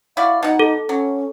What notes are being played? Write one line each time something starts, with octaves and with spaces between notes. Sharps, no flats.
E4 F#4 D5 F5
B2 D#4 F#5
A4
F#3 C#4